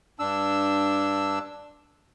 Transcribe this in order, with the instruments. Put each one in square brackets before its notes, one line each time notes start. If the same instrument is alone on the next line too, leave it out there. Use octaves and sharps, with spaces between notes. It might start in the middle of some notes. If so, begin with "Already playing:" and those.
[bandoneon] G2 D4 E6